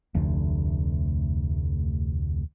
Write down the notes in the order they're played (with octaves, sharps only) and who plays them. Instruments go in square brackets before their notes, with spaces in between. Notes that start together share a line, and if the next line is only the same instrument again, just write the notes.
[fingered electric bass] F1 D2